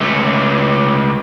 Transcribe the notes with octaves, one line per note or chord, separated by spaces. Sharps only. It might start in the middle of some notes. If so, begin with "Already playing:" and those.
C#2 A3